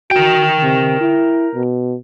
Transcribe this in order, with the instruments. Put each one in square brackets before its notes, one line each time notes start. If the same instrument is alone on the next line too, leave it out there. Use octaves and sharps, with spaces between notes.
[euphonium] F#4 [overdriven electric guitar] A#4 G5
[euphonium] C3
E4
B2